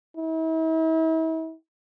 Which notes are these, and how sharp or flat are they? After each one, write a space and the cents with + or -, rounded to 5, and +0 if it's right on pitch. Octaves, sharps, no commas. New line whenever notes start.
E4 -40